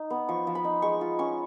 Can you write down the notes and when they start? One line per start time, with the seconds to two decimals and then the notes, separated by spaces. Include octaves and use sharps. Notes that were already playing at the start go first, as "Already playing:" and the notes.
Already playing: D#4
0.10 B3
0.29 F3 C#6
0.47 F3
0.55 B5
0.64 D#4
0.82 G#3 C#6
1.01 F4
1.19 C#4 C#6